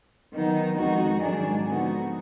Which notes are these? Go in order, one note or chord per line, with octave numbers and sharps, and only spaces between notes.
D#3 F#3 B3 D#4
F2 D#3 G#3 D#4 F#4
G#2 D#3 F#3 D4 G#4
D3 F3 B3 D#4 F#4